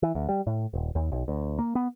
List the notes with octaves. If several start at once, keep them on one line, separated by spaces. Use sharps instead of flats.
E3
D2
G3
A2
D#1
D#2
B1
D2
A#3
B3